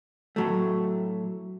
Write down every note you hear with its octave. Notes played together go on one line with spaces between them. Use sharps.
A2 F#3 A3